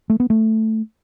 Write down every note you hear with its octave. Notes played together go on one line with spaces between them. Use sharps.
A3
B3
A3